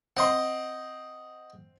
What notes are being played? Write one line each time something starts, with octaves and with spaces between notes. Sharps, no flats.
C4 D#5 F#5 C6